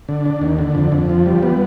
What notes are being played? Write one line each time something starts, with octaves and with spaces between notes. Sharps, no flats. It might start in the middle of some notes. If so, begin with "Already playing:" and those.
D3
D4
D#2
D3
F2
F2
F3
G3
B3